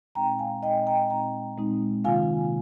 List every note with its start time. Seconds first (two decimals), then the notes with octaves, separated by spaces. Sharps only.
0.15 A#2 G#3 C4 D#4 G5 A#5
0.39 F5 G#5
0.63 A#2 G#3 C4 D#4 D#5 G5
0.87 G5 A#5
1.10 A#2 G#3 C4 D#4 G5 A#5
1.57 A#2 G#3 C4 D#4
2.04 C3 D#3 A#3 F4 F5 G#5